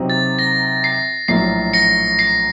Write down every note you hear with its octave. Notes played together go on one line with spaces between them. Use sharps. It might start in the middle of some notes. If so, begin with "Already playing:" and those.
Already playing: C3 F#3 C4 D#4
A6
A#6
C7
A#1 A2 F#3 A#3 C7
A#6 C#7
C7